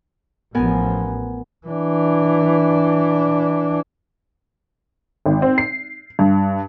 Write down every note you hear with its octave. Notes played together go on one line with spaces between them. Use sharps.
A1 F3 B3 A#4 G#5
E3 D4
G#1
C4
C7
G2